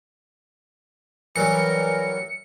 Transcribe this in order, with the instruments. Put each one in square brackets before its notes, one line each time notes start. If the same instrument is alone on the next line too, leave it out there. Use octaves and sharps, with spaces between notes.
[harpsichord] E3 F#3 G3 [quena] A#4 [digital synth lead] C#7